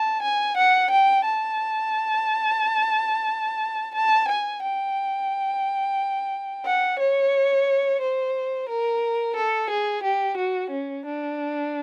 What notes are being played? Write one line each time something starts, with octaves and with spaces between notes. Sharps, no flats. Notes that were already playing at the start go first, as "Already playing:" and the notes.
Already playing: A5
G#5
F#5
G5
A5
A5
G#5
G5
F#5
C#5
C5
A#4
A4
G#4
G4
F#4
C#4
D4